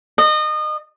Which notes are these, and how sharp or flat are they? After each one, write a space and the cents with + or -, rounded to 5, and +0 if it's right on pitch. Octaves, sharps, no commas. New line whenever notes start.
D#5 -30